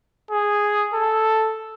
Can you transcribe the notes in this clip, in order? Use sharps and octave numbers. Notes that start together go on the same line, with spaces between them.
G#4
A4